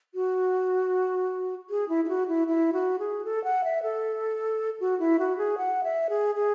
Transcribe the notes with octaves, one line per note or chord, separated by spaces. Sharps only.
F#4
G#4
E4
E4
F#4
E4
E4
F#4
G#4
A4
F#5
E5
A4
F#4
E4
F#4
G#4
F#5
E5
G#4
G#4